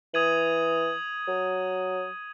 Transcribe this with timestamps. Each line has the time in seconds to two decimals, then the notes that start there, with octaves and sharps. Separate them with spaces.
0.14 E3 D#6 G#6 D#7 F#7
1.28 F#3